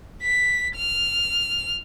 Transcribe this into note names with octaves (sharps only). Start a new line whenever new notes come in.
B6
F6